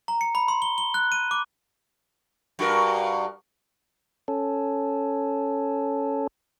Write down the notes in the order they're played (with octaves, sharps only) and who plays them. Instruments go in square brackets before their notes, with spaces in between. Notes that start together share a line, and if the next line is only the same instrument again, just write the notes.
[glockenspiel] A#5
C#7
B5
C6
G7
G7
F#6
D#7
D6
[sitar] G2 F#4 A#4
[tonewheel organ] C#4 A4